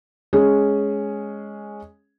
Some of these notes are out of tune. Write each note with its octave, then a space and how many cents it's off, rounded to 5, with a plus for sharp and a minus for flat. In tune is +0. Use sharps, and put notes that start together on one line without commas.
G#3 +0 C#4 +0 G#4 +0